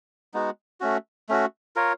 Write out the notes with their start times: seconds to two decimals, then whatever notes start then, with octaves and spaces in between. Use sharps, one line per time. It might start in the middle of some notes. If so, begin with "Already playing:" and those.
0.34 G#3 B3 D#4 F#4
0.80 A3 C#4 F#4
1.29 A3 C#4 F#4
1.76 F4 A#4 C#5